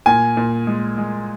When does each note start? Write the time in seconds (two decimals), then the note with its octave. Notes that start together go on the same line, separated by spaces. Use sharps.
0.06 A#2 G#5
0.37 A#2
0.67 G#3
0.98 G#3